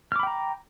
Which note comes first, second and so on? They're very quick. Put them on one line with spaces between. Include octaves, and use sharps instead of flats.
F6 D6 B5 G5 A#5